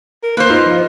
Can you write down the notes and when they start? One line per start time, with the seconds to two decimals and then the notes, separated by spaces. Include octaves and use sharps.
0.23 A#4
0.37 A#3 B4 C5
0.50 D#4 F4
0.66 F3